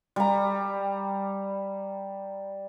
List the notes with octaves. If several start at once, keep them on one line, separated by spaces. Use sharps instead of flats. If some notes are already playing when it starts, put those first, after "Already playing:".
G3 A#5